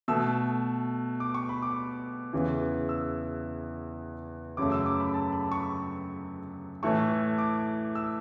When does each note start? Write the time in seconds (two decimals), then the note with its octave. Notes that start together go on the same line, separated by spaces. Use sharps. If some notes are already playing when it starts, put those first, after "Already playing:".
0.08 B2 A3 E6
1.20 D6
1.34 C#6
1.49 B5
1.62 D6
2.33 E2 C#3 E3
2.89 E6
4.57 F#2 C#3 F#3 A3 D6
4.72 E6
4.86 D6
5.00 B5
5.14 A5
5.32 B5
5.52 C#6
6.83 A2 E3 A3 C#6
7.38 D6
7.95 E6